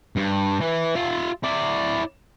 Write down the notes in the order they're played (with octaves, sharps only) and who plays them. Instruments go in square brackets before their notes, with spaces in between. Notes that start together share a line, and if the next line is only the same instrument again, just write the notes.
[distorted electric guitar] G2
E3
F4 E5
E4 D5